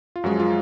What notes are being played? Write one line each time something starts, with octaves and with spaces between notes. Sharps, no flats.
F4
F#2 F3 G#3 F#4
F4